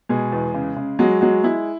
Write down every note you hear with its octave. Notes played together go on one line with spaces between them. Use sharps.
B2 G#3 G#4
E2
C#3
C#3
F#3 G#3 F#4
F#3 G#3 F#4
G#3 E4